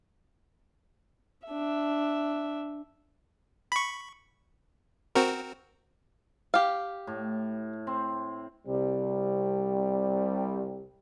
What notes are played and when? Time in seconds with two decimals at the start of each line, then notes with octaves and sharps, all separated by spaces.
1.48 D4 E5
3.72 B5 C#6
5.15 C4 F#4 A#4
6.54 G4 F5
7.07 A2
7.87 C4
8.67 C2 C3 G3